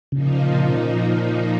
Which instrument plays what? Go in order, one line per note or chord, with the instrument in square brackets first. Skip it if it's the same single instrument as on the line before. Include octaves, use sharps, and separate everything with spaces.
[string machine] A#2 F3 A#3 D#4 [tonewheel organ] C#3